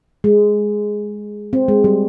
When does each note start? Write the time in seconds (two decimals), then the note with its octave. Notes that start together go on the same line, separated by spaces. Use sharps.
0.24 G#3
1.53 C4
1.68 G#3
1.84 G3